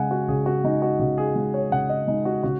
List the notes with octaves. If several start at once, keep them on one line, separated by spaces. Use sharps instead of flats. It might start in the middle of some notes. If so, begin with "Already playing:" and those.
Already playing: C#3 G#3 F#5 G#5
F#4
C#3 G#4
F#4
G#3 D#4
F#4
C#3 F#4
G#4
G#3
C#5
C#3 F#5
D#5
G#3 D#4
F#4
C#3 F#4